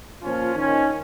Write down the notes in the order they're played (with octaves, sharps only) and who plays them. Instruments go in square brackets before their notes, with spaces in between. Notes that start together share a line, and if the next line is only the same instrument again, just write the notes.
[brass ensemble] A#2 F3 C#4 F4
D#3 C#4